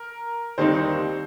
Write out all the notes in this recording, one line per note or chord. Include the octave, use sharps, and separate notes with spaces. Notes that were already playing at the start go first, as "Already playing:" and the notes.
Already playing: A#4
D#2 D#3 G3 C4 D#4 C5